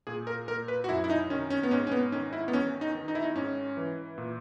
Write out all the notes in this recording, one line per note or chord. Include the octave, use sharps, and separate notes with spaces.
A#2 G#4
A#4
A#2 A#4
B4
F#4
F#2 E4
E4
D#4
D#3 C#4
C#4
B3
G#2 C#4
C#4
B3
D#3 C#4
E4
B3
E2 C#4
D#4
D#3
D#4
E4
D#4
G#2 C#4
E3
A#2